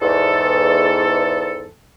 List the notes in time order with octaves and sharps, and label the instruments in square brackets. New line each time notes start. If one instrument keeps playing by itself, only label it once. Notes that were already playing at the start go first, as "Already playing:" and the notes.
[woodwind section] E2 G#2 A4